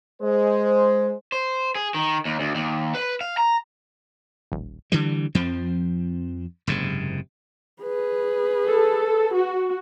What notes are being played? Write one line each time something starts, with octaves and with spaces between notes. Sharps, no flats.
G#3 C5
C5
G#4
D#3
D#2
D2
D#2
B4
F5
A#5
D#1 A1
D3 E3 G3
F2 F3 C4
F#1 G#2 C3
G#4 B4
A4
F#4